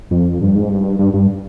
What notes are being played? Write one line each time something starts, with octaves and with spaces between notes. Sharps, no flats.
F2
G2
G#2
G2
G2
G2